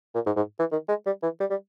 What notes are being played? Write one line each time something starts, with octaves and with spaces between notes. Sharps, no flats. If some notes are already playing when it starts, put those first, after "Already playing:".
A#2
G#2
G#2
E3
D#3
G#3
G3
E3
G3
G3